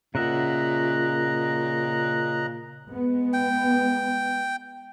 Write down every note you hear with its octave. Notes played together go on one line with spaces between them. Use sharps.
A#2 C#3 D#5 E5 F#5 A#5 F#6
G#3 B3
G5